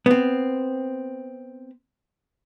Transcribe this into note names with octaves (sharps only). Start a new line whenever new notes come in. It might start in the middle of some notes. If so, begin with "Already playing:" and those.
B3 C4